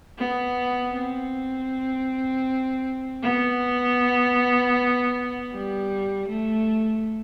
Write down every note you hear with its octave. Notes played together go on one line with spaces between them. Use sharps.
B3
C4
B3
G3
A3